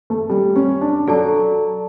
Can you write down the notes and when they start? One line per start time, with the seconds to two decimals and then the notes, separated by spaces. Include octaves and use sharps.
0.10 A3
0.30 G3
0.56 C#4
0.81 D4
1.07 F#3 A4 D5 A5